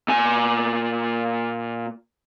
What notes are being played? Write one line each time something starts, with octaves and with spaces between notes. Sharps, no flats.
A#2 G#5